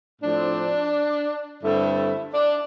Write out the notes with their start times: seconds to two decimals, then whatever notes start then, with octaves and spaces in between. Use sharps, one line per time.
0.21 A2 F3 C4 D4
1.63 G2 D3 A3 C4 E4
2.34 D4